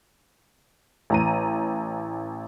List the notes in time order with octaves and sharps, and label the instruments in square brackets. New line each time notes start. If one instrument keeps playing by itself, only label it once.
[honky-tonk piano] A1 A#5 D#7